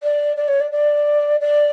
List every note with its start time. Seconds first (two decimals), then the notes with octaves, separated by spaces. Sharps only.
0.03 D5
0.37 D5
0.48 C#5
0.60 D5
0.71 D5
1.40 D5